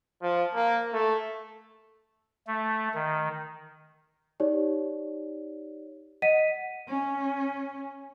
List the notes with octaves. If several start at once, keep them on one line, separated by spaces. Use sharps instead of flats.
F3
A#3
A3
A3
D#3
D#4 G4 C#5 D5
D#5 F#5 B6 D#7
C#4